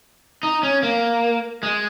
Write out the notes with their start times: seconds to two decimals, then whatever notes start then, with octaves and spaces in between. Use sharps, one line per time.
0.43 D#4
0.63 C#4
0.83 A#3
1.63 G#3